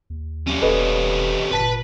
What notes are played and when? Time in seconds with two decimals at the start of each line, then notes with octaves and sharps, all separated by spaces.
0.10 D#2
0.48 G3 C#4
0.62 E1 A4 B4 D#5
1.51 G1 A#2 B4 A5 B6